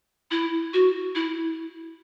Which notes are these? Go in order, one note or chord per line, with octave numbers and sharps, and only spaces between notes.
E4
F#4
E4